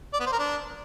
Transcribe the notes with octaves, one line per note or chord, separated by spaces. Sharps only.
D5
B3
C5
A#4
D4